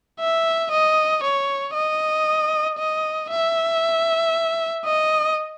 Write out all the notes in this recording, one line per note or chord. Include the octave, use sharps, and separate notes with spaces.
E5
D#5
C#5
D#5
D#5
E5
D#5